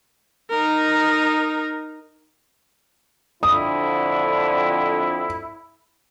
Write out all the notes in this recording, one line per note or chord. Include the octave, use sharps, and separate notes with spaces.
D#4 A#4
F2 D3 E4 D#6